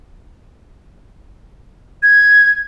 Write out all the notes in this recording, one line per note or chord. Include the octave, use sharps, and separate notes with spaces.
G#6